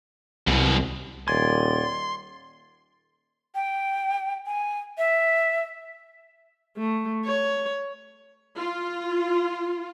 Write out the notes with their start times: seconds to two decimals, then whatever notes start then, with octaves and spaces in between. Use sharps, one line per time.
0.47 C2 F#2 B2
1.28 D#1 D5 G#5 C6
3.55 G5
4.46 G#5
4.98 E5
6.77 A3
7.25 C#5
8.59 F4